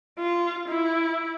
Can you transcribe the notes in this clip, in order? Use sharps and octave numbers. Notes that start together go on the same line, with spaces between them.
F4
E4